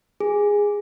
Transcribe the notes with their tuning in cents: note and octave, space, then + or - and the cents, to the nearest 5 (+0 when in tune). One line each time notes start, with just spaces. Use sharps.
G#4 -10